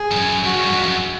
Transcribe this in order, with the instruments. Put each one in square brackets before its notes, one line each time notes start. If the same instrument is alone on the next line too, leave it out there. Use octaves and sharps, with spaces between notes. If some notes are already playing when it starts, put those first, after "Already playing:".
Already playing: [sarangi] G#4
[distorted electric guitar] G2
F#2
[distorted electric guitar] F#2 [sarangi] F#4
[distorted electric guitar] G2
F2
F#2